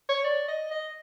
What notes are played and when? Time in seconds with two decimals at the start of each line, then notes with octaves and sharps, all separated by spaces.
0.09 C#5
0.24 D5
0.48 D#5
0.71 D#5